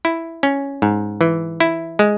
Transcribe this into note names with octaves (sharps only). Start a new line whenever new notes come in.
E4
C#4
G#2
E3
E4
G#3